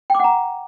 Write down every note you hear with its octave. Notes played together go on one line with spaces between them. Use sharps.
F#5 G5 A#5 D6